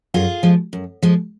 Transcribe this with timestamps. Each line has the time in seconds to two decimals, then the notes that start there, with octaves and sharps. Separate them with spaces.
0.14 F#2 F4 G#4
0.43 F3 G#3
0.73 F#2
1.02 F3 G#3